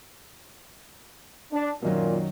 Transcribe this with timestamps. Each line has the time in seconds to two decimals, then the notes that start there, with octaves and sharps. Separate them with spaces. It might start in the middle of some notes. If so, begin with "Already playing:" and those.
1.52 D4
1.82 F#2 A#2 D#3 F#3